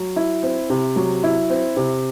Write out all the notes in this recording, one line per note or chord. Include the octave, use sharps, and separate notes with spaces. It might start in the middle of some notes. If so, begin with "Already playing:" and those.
Already playing: F#3
E4
C4
C3
F#3
E4
C4
C3